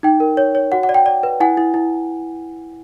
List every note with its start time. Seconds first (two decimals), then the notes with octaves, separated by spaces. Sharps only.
0.03 D#4 G5
0.20 A#4
0.37 C#5
0.55 C#5
0.72 F#4 F#5
0.83 F#5
0.89 D5
0.94 G5
1.06 D5
1.23 B4
1.40 E4 F#5 G#5
1.57 E4
1.74 E4